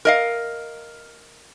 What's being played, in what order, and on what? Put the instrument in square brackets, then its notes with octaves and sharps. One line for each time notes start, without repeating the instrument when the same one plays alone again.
[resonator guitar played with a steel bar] A#4 D#5 F5